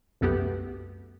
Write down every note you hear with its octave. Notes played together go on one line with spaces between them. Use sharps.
C2 F#2 A3 B3 F#4 G4